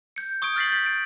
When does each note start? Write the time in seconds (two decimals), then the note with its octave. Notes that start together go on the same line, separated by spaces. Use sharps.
0.16 G6 C#7
0.42 C#6 D#6 G6 G#6 D7
0.56 F6 G6 A6 B6 C7 F#7
0.72 G6 A6 B6
0.86 D7